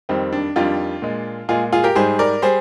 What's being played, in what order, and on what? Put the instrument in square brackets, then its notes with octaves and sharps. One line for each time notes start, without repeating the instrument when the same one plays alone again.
[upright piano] F2 D#3 G3 C4
D4
F2 D#3 G3 D4 F4
A#2 G#3
A#2 G#3 F4 G#4
F4 G#4
G4 A#4
G#2 G3 G#4 C5
A#4 D5
G3 G#4 C5